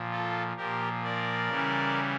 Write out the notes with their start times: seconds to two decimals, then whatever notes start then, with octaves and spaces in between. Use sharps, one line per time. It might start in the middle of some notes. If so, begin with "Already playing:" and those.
Already playing: A#2 F3
0.11 F4 A4
0.57 A#2 F3 G4 A#4
1.03 A#4 D5
1.49 C#3 E3 G3